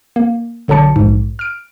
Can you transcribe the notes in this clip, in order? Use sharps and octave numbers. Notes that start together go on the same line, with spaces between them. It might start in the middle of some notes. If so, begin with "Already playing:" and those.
A#3
B1 D3 F#3 A5 C#7
A#1 G#2
F6 D7